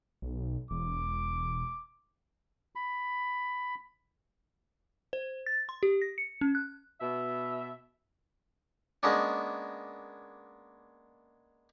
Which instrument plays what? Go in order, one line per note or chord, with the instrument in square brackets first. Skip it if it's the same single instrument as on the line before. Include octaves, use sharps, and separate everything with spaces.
[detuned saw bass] B1
[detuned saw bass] E1 [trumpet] D6
[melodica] B5
[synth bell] C5
A6
C6
G4
A#6
C#7
C#4
F#6
[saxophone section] B2 E5
[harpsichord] G#3 A#3 B3 C#4 D4